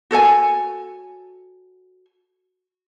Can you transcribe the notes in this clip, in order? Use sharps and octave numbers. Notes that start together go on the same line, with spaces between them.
F#4 A4 C#5 G#5